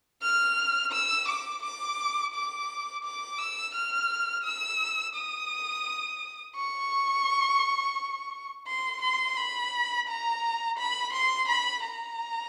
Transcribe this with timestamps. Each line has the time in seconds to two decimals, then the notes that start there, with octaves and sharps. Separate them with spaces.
0.22 F6
0.92 E6
1.28 D6
1.63 D6
2.33 D6
3.04 D6
3.38 E6
3.74 F6
4.44 E6
5.15 D#6
6.56 C#6
8.67 C6
9.02 C6
9.37 B5
10.07 A#5
10.78 B5
11.13 C6
11.48 B5
11.84 A#5